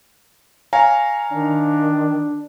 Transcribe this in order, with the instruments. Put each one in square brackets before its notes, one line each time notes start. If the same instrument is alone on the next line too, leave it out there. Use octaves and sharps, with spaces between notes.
[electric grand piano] C#5 F5 A#5 [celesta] G#5
[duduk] D#3 [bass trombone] D4